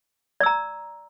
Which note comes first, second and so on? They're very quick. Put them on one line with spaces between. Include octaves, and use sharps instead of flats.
D5 E6 A#5